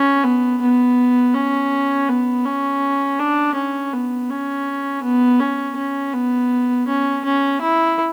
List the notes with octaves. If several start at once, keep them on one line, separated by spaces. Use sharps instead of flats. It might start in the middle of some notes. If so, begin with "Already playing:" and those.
Already playing: C#4
B3
B3
C#4
B3
C#4
D4
C#4
B3
C#4
B3
C#4
C#4
B3
C#4
C#4
E4